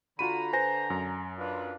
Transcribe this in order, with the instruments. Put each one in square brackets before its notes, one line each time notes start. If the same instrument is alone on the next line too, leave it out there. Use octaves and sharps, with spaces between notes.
[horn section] D3 A#5 [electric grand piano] F4 F#4 B5 [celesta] D#7
[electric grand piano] B4 C5 [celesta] G#5 A#6
[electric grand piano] F#2
[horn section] D4 F4 B4